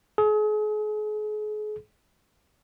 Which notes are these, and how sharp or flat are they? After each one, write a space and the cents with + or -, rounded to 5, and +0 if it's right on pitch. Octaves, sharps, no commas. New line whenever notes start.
G#4 +40